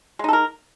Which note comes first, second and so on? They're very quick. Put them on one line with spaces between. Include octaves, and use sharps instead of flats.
G#3 D#4 A4 A#4